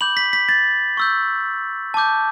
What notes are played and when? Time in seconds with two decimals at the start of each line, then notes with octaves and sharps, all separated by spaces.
0.01 B5 D6 G6 F#7
0.17 B6
0.33 B6
0.49 A6
0.97 C#6 E6 G6
1.94 A5 D6 G6